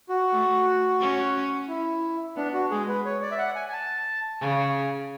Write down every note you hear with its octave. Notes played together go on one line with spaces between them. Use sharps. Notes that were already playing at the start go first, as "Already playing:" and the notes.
F#4
A3
C#4
E4
B3 D4
F#4
G#3 G#4
B4
C#5
D5
E5
F#5
G#5
G#5
A5
C#3 G#5